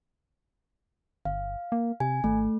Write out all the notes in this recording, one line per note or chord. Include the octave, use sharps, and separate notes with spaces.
G1 F5
A#3
C3 G#5
G#1 A3